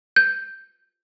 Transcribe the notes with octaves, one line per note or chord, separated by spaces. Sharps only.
G6